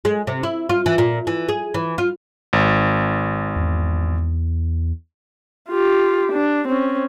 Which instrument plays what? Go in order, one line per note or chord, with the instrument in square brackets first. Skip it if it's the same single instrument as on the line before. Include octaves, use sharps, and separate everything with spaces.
[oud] G#3
C3
E4
F4
E3
A#2
E3
G#4
E3
F4
[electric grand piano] G#1
[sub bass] E2
[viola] F4 G4
D4
C4 C#4